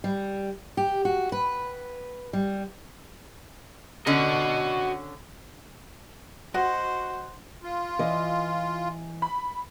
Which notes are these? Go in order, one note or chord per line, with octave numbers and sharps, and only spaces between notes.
G3
G4
F#4
B4
G3
D3 C#4 F#4 D#5
F#4 C5 D#5 F#5
F4
E3 D#5
B5